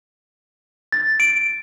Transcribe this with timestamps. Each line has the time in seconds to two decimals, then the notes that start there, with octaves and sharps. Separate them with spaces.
0.92 A6
1.20 D7